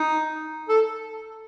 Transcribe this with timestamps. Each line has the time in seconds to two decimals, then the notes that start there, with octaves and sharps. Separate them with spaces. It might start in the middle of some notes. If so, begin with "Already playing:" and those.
Already playing: D#4
0.68 A4